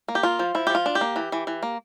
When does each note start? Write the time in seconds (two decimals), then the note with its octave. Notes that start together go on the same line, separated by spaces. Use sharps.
0.08 A#3
0.15 G4
0.23 A#3 F4
0.39 F3
0.55 F3 E4
0.67 F3 G4
0.75 F4
0.86 D4
0.95 G4
1.01 A#3
1.16 E3
1.32 E3
1.47 E3
1.63 A#3